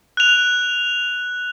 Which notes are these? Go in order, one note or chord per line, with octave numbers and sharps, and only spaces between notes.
F#6 F7